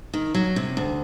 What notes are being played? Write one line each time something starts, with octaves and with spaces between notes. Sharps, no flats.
D#3
F#3
C3
D2